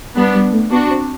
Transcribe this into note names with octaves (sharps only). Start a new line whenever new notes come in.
G3 B3 D4
G3
A3
B3 D4 F#4
C4